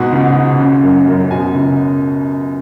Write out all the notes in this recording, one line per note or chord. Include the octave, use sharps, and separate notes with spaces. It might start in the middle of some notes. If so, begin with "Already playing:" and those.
Already playing: G#2 B2 F#5
C#2
C#2
C#3
F#2
F#2
B2 G#5
C#2